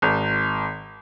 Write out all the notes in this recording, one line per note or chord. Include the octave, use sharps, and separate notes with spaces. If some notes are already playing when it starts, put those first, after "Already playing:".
G#1